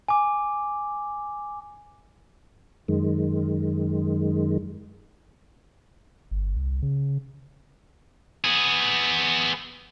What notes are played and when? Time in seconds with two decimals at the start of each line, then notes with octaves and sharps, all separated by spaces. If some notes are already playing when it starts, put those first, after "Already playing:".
0.08 G#5 D6
2.88 F#2 D#3 G#3
6.31 G1
6.56 C2
6.82 C#3
8.44 B3 G#4